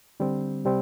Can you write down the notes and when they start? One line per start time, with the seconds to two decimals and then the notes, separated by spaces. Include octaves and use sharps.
0.20 D3 G3 C4
0.65 C3 G3 C4